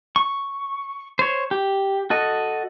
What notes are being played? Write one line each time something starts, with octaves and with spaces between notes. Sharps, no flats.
C#6
C5 C#5
G4
F#4 A4 D#5